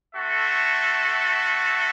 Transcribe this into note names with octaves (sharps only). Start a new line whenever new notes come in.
A3 C4 F#4 A4 E5